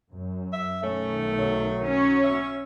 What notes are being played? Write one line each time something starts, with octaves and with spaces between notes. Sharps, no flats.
F#2
E5
B1 D#3 A3 C#4
F#3
C#4 C#5
E5